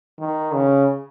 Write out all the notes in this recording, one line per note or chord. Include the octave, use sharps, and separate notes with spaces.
D#3
C#3